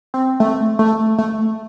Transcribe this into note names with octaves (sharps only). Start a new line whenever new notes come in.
C4
A3
A3
A3